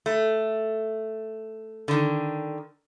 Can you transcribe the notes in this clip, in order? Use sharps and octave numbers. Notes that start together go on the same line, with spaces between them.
A3
D3 D#3